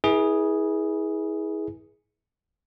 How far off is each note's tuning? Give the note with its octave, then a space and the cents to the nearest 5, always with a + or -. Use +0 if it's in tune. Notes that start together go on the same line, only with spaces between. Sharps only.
E4 -35 G#4 +0 B4 -40